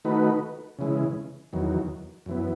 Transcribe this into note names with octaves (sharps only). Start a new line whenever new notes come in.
D#3 A3 D#4 F#4 B4
C#3 E3 G#3
E2 D#3 F#3
F#2 E3 B3